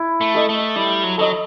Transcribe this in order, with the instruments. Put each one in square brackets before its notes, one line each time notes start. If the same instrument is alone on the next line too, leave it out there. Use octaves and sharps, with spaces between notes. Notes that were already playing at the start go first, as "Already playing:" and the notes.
Already playing: [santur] E4
[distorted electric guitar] A3
[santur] A4 D#5
[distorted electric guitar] A3
[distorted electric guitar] G3 [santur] E4
[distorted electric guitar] F#3
[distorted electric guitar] F#3 [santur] A4 D#5